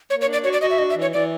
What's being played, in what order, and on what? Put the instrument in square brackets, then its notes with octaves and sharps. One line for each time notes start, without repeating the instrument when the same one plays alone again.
[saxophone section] A#3 [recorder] C#5
[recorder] C#5
[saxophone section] D4
[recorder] D5
[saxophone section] F#4 [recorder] C#5
[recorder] D5
[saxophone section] F#4 [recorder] D#5
[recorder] E5
[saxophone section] D4 [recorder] D#5
[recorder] E5
[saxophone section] E3
[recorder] C#5
[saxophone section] E3 [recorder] D5